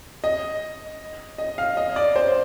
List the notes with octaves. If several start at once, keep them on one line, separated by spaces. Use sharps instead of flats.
D#5
D#5
F5
D#5
D5
C5